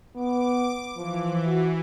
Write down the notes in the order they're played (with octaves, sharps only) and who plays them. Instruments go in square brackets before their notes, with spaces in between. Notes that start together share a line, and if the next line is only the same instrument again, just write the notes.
[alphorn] B3 [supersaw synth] D6
[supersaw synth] E3 [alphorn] F3
[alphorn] F#4